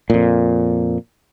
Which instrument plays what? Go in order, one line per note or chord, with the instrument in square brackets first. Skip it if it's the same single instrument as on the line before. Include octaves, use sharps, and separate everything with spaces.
[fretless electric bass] F2 A#2